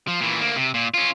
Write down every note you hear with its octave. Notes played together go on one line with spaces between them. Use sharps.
F3
A#2 E3
D2 A#3
C3
A#2
C#4 F4